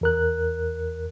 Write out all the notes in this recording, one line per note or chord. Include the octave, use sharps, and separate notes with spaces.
E2 A#4 F#6